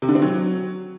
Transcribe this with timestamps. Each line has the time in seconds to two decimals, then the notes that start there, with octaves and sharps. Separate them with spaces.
0.02 C3
0.09 D3
0.15 C4
0.22 F#3